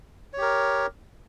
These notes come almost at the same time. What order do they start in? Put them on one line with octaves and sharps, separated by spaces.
C#5 G4 A#4